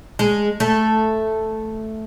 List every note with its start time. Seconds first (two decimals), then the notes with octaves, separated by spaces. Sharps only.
0.19 G#3
0.60 A3